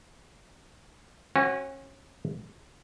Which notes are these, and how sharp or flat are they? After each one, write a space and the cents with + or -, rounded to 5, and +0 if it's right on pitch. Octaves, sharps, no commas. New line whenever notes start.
C#4 -30 F#4 +10